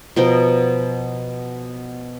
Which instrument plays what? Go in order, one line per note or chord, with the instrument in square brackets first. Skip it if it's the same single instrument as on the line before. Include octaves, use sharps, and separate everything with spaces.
[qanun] B2 F3 A#4 G5